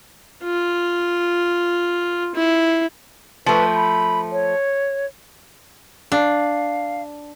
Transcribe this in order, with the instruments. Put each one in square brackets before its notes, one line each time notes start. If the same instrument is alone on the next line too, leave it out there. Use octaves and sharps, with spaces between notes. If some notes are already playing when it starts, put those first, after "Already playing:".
[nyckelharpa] F4
E4
[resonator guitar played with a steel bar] F3 A3 [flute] B4
[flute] B5
C#5
[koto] D4 [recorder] F5